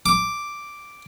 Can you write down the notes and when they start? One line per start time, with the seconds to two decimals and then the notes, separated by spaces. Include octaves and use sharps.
0.06 D6